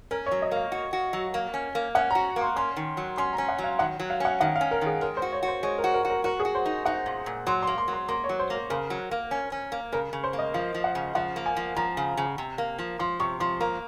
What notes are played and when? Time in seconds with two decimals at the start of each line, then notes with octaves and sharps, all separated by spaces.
0.11 C#4 A#4
0.26 C#5
0.31 F#3
0.42 D#5
0.51 A#3
0.57 F5
0.72 F#4
0.93 F#4
1.13 F#3
1.34 A#3
1.54 C#4
1.75 A#3
1.95 C#4 F#5
2.11 A#5
2.15 F#4
2.36 A#3 C6
2.56 C#4 C6
2.77 D#3
2.97 F#3
3.18 C#4 C6
3.33 A#5
3.38 C#4
3.49 F#5
3.58 F#3
3.64 F5
3.79 D#3 F#5
4.00 F#3
4.10 F5
4.20 C#4 F#5
4.40 D#3 F#5
4.56 F5
4.61 C#4
4.71 A#4
4.81 D#3 G#4
5.01 G#3 A#4
5.17 C5
5.22 F#4
5.32 C#5
5.43 F#4
5.48 C5
5.63 G#3 C#5
5.78 A#4
5.84 F#4
5.94 A#4
6.05 F#4
6.10 A#4
6.24 F#4 A#4
6.40 G#4
6.45 F#4
6.55 C5
6.66 D#4
6.86 D#4 F#5
7.06 A#2
7.26 A#2
7.47 F#3 C6
7.63 C6
7.67 A#3
7.78 C6
7.88 F#3
7.93 C6
8.09 A#3 C6
8.24 C#5
8.29 F#3
8.39 C5
8.50 A#3 A#4
8.70 C#3 A#4
8.90 F#3
9.11 A#3
9.31 C#4
9.52 C#4
9.72 A#3
9.92 C#3 A#4
10.13 C#3
10.24 C5
10.33 A#3
10.39 D#5
10.54 F3 F5
10.74 F3
10.84 F#5
10.95 C#3
11.15 F3 F#5
11.36 A#3
11.46 G#5
11.57 F3
11.76 F3 A#5
11.97 C#3
12.17 C#3
12.38 C3
12.58 A#3
12.79 F3
12.99 F3 C6
13.20 C3 C#6
13.40 F3 C6
13.61 A#3 A#5